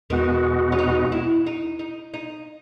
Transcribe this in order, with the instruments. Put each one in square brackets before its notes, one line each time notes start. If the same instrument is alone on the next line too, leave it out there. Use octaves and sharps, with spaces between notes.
[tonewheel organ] E2 B2 G#3 B3 F#4 [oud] D#3
[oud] C#4
D#4
E4
D#4
D#4
D#4